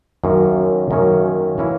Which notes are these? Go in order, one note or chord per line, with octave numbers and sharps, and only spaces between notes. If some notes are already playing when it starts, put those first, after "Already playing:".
F#2 D#3 A#3 C#4
F#2 D#3 A#3 C#4
E3 A#3 C#4 E4